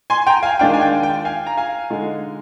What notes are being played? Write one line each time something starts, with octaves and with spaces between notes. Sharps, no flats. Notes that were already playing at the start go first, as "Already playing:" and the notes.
G#5 C6
G5 A#5
F5 G#5
D#3 G#3 D4 F4 G5
G#5
G5
G5
F5 G#5
A#5
F5 G#5
D3 G#3 D#4